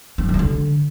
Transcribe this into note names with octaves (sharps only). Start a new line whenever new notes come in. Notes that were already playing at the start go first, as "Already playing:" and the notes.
C4
F3
E3
G3
D3